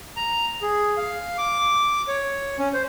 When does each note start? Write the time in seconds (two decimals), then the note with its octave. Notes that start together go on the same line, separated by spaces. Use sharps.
0.16 A#5
0.62 G#4
0.97 F5
1.38 D6
2.08 C#5
2.59 C#4
2.74 C5